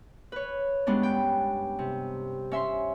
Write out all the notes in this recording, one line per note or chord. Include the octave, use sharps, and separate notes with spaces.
B4 C#5
G2 G#3 B3 C#4 D4
G5
C3
C#4 E5 C6